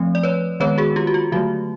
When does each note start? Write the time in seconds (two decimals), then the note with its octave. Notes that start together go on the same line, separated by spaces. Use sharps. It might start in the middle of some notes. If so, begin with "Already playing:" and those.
Already playing: F3 A3 C4
0.15 D5
0.23 B4 C#5
0.60 D#3 G#3 B3 B4 C#5
0.78 F#4 G#4
0.96 F4 G4
1.07 F#4
1.14 F4
1.32 D3 F#3 A3 F#4